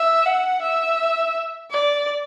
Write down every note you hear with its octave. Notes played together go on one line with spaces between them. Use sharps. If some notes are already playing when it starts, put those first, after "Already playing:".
Already playing: E5
F#5
E5
D5